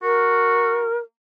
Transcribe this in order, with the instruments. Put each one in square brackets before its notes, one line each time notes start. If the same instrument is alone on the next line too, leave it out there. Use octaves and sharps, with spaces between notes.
[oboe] F#4 [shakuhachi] A#4